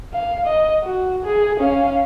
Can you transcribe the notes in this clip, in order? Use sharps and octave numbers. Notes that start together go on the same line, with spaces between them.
F5
D#5
F#4
G#4
C#4 F5